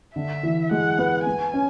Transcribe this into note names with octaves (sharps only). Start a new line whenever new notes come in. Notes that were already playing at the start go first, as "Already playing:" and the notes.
D3 E5
E3
G#3 F#5
B3
B3 G#5
C#4